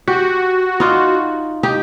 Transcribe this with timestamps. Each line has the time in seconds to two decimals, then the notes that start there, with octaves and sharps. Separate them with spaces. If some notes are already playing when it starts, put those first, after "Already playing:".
0.08 F#4 G4
0.80 D#4 F4 D5
1.63 D#4 G4